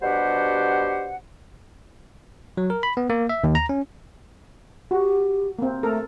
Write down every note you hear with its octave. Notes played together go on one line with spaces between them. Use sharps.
B2 G3 D4 G4 C5 F#5
F#3
A#4
B5
B3
A#3
E5
D#2
A#5
C#4
F#4 G4
A#3 C4
A3 A4 A#4